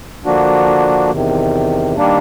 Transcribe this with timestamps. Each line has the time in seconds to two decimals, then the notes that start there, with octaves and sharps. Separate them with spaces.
0.25 D3 F3 A#3 D4 F#4
1.10 E2 C3 D#3
1.97 D#3 G3 A#3 D4